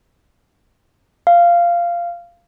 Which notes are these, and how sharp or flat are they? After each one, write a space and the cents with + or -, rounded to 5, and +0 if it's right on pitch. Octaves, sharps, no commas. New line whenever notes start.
F5 -15